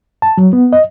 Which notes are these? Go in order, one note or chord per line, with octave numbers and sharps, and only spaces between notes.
A5
F#3
B3
D#5